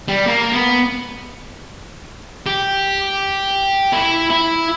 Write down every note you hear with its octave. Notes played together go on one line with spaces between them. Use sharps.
G3
A#3
B3
G4
E4
E4